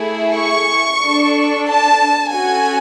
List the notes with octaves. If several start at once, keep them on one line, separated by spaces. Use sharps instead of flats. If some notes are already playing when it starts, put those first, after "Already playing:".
Already playing: A3 E4 G#4
C#6
D4 A4
A5
C#4 F#4 A4 G#5